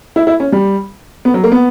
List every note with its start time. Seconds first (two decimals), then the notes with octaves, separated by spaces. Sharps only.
0.16 E4
0.27 E4
0.40 C#4
0.52 G3
1.25 B3
1.34 F#3
1.44 A#3
1.52 B3